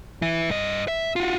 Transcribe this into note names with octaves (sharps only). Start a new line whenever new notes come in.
E3 E4
G2 D#5
E5
F4 F#4